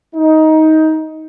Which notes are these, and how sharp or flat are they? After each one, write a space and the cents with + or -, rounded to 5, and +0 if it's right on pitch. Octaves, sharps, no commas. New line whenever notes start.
D#4 +15